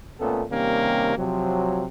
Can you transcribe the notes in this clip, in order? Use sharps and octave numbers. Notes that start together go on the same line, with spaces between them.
A#2 A3 B3 C#4 A4
C3 D#3 G3 A#3 C#4
C3 F3 F#3